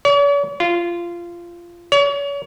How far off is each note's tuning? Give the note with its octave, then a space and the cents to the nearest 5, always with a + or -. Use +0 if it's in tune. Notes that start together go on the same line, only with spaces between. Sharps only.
C#5 +45
F4 -20
C#5 +35